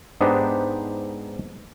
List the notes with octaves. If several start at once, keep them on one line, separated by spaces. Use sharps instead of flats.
G#2 B3 D4 D#4 G4 C5